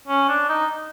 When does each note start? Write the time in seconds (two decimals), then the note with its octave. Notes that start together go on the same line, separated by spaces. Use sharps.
0.08 C#4
0.29 D4
0.49 D#4